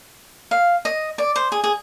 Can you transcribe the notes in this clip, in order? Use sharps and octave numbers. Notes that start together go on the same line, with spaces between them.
F5
D#5
D5
C5
G#4
G#4